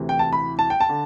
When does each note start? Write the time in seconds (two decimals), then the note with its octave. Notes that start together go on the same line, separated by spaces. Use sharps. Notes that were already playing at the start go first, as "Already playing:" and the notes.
Already playing: D2 C3 E3
0.09 G5
0.19 A5
0.33 B5
0.59 A5
0.70 G5
0.80 A5
0.89 D3